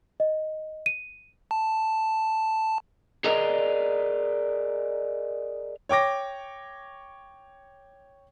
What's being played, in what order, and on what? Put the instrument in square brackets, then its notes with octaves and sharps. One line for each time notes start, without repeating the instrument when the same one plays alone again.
[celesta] D#5
D#7
[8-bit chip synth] A5
[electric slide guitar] G#4 A#4 B4 D5 D#5 A#5
[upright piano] C#5 G5 D6 A#6